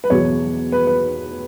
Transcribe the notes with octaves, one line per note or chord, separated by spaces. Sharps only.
B4
E2 B2 F#3 C#5
B4
B4